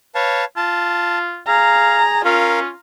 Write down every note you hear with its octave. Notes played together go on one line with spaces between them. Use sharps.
B4 C#5 F5 A5
F4 A5
G#4 F5 A#5
C#4 F4 A#4 F5